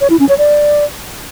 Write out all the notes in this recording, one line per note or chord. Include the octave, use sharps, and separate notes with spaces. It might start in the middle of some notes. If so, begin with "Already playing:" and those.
C#5
E4
C#4
C#5
D5